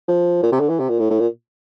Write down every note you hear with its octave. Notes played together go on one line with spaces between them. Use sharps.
F3
A#2
C3
D3
E3
C3
A#2
A2
A2
A#2